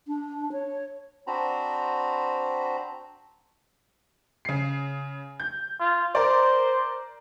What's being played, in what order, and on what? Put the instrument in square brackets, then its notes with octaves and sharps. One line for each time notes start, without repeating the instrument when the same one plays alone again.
[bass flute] D4
C#5
[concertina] C4 D4 F#4 C5 A#5 B5
[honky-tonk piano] C#3 C7
G6
[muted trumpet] F4
[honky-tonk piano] A#4 D5 [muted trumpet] C5